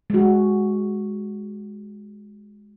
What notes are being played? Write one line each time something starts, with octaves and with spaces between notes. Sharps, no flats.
G#3 F#4